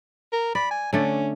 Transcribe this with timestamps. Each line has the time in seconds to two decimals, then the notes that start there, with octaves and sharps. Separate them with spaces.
0.32 A#4
0.55 D5 B5
0.71 G#5
0.93 D3 A3 C#4 D5